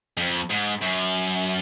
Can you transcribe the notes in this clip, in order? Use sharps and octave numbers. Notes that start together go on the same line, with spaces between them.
F2
G#2
F#2